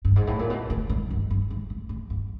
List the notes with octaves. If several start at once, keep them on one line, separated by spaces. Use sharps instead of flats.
G2
G#2
A2
A#2
B2
A2
G#2
G2
G2
G#2
A2
A2
G2